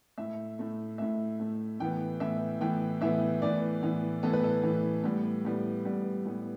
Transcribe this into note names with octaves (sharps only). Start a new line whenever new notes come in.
A2 A3 E5
A2 A3
A2 A3 E5
A2 A3
A2 E3 B3 G5
A2 E3 B3 E5
A2 E3 B3 G5
A2 E3 B3 E5
A2 E3 B3 D5
A2 E3 B3
A2 E3 B3 A4
B4
A4
A2 E3 B3
A2 G3 B3
A2 G3 B3
A2 G3 B3
A2 G3 B3